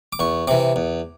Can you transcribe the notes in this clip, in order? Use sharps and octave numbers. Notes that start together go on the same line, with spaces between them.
D6
E2 C#6
C3 E3 D6
E2